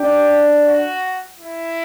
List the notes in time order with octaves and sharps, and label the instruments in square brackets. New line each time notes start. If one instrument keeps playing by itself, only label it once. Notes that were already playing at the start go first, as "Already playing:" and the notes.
Already playing: [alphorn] D4 [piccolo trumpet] G4
[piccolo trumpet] F#4
E4